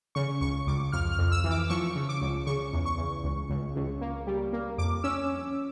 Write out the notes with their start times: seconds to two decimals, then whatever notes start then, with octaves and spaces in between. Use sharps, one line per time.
0.15 C#3 C#6
0.41 C#2 C#6
0.67 C#2 D6
0.92 F2 F6
1.12 F6
1.18 F2
1.32 E6
1.44 E3
1.51 D6
1.69 F3 C#6
1.95 C#3
2.09 D6
2.21 C#2
2.46 C#3 C#6
2.73 E2
2.85 C#6
2.98 E2
3.24 C#2
3.50 C#2
3.76 C#2
4.01 A#3
4.27 G3
4.53 A#3
4.78 F2 D6
5.04 C#4 E6